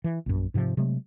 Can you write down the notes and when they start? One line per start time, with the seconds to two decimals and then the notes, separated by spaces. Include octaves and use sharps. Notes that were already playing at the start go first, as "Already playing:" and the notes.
0.04 E3
0.26 A#1 F#2
0.54 G#2 C3 D#3 F3
0.77 C3 F#3 G#3 A3